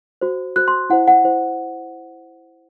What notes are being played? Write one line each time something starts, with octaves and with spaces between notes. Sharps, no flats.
F#4 C5
F#4 C5 F#6
C6
E4 C5 F#5
F#5
E4 C5